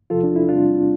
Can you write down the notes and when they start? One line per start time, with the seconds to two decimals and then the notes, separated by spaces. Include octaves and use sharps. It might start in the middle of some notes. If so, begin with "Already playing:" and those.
0.10 E2 C3 F3 F4 A4
0.23 D4
0.36 E4
0.48 E2 C3 G3 C4 D4 F4